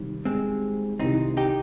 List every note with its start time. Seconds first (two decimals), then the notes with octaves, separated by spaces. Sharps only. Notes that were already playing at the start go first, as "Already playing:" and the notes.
Already playing: C3 D#3 G3
0.25 G#3 C4
1.00 C2 C3 D#3 C4 D#4
1.37 D#4 G4